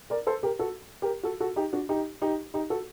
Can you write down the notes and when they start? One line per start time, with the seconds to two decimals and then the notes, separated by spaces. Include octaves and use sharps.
0.10 A#4 D5
0.27 A4 C5
0.43 G4 A#4
0.59 F#4 A4
1.02 G4 A#4
1.23 F#4 A4
1.40 F#4 A4
1.56 D#4 G4
1.73 D4 F#4
1.89 D#4 G4
2.22 D#4 G4
2.54 D#4 G4
2.70 F#4 A4